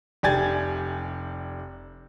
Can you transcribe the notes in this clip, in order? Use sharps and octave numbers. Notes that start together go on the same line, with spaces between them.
F1 D4 G4 G#5 G#6 A6